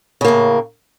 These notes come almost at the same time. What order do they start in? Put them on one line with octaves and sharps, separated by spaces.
C#3 A#3 A2